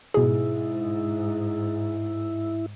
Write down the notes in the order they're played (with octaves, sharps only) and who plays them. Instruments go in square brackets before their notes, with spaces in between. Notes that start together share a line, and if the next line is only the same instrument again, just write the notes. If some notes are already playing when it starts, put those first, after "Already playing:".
[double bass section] G#2 [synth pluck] B2 G#4 [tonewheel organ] E4